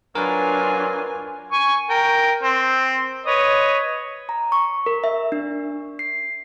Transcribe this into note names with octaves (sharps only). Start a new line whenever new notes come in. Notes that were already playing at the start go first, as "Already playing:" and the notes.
F#3 D4 F4 A#4 B4 G#5
G#5 C#6
A#4 G5
C4
B4 C#5 D#5
A#5
C#6
A#4
E5
D4
C7